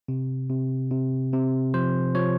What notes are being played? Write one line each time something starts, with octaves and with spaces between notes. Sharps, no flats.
C3
C3
C3
C3
F3 C5
F3 C#5